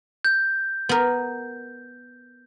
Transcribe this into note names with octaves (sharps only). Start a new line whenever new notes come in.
G6
B3 A#4